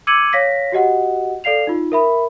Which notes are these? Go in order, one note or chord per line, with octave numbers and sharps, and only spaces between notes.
D6 E6 G#6 C#7 D#7 F#7
C#5 F5 A#6 B6
F#4 G4 D#5 F#5
A4 D5 F5 C7 F7
D#4 F4
A#4 E5 B5